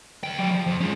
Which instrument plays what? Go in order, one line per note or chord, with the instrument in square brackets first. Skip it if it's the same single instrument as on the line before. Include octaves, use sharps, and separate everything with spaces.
[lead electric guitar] D#2 G5
F#3 D5
F3
F2
G#3 C#4